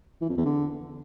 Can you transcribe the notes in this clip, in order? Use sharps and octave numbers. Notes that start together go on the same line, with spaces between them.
E3
F2
E2
D3